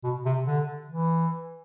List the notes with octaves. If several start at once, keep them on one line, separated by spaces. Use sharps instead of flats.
B2
C3
D3
E3